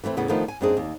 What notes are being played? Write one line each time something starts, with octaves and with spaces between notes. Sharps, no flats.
E3 A3 C4 E4
E2 A2 C#3 B3
D#3 F3 A3 B3 D4 D#4
G#5
F#2 A#3 C4 D4 D#4 G#4
D#2